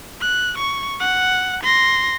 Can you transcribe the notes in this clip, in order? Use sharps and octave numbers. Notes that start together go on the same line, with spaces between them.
F#6
C#6
F#5
C6 A#6